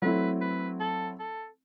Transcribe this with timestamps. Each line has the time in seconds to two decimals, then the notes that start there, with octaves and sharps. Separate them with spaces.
0.02 F#3 A3 C4 E4 B4
0.41 B4
0.80 A4
1.19 A4